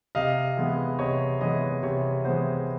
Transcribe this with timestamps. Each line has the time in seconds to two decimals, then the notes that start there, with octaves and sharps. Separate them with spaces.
0.15 C3 D#5 F5
0.57 E3 G#3 B3
0.99 C3 C#5 D#5
1.41 E3 G#3 B3 C#5 D#5
1.83 C3 C#5
2.25 E3 G#3 B3 C5